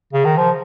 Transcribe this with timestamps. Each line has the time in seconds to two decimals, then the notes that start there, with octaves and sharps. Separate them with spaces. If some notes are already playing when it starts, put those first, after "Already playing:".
0.13 C#3
0.25 D#3
0.37 F3